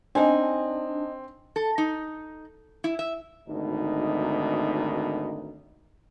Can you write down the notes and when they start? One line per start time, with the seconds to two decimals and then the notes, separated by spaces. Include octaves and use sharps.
0.15 C4 D4 D#4 G#5
1.56 A4
1.78 D#4
2.84 E4
2.99 E5
3.48 G#1 D2 B2 D#4